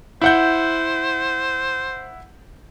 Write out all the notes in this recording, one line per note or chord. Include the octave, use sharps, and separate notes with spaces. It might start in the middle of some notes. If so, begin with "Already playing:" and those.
E4 C5 F#5 G6